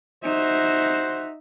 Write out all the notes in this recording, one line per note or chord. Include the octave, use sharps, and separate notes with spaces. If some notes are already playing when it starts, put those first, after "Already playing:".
D#4 F#4 C5 E5